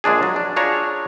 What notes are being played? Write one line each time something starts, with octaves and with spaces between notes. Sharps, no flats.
A#1 G#3 D4 G#4
F#3
D4
D4 F4 G#4 C#5 A#5